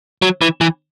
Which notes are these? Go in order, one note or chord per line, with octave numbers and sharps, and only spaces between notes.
F#3
E3
E3